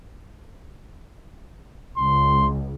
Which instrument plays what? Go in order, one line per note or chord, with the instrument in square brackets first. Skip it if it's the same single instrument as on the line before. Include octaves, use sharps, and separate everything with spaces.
[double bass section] C#2 [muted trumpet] C6